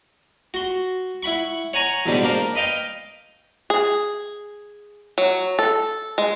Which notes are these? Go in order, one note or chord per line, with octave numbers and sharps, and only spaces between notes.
F#4 C6
E4 F#5 B5 C#6
C#5 F#5 G#5 A#5 C#6
A1 G#2 B2 D3 G3 G4
A#3 D4 A#4 C5
B4 D#5 F5 G5
G#4
F#3
A4
G#3